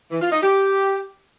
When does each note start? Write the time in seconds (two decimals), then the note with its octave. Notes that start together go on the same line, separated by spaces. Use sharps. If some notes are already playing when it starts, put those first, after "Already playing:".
0.11 E3
0.21 F4
0.32 D#4
0.42 G4